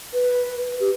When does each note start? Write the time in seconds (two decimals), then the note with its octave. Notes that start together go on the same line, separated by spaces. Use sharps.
0.14 B4
0.80 G4